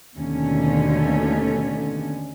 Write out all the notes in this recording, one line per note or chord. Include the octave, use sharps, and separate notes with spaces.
D#2 B2 D3 A3 C#4